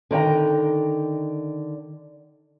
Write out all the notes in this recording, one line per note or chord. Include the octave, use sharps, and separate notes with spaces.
D3 D#3 D5 G5 A#5